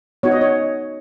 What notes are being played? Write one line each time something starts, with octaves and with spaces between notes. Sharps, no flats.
B3 D#4 F#4 C#5
D#5
C#5